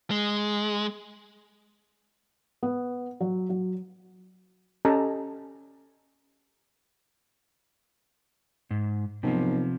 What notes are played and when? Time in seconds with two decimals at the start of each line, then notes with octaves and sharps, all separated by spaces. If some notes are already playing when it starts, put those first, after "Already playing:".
0.11 G#3
2.63 B3
3.20 F#3
3.50 F#3
4.85 C#4 G4 A4 D#5 A5 A#5
8.71 G#2
9.23 B1 C3 F3